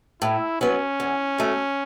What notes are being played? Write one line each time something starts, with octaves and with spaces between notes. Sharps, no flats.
A2 E4
F#3 B3 C#4
E2
B2 A3